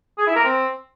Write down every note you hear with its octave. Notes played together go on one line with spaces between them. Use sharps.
G#4
E4
A#4
C4